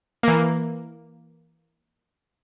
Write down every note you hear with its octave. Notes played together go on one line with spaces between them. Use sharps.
E3 A#3